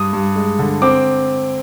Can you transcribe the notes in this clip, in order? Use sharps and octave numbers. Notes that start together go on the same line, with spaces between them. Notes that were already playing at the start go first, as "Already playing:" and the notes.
Already playing: G2 D#6
G2
G#3
D3
C4 D6